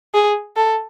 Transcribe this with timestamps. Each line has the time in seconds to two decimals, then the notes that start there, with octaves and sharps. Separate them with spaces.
0.14 G#4
0.56 A4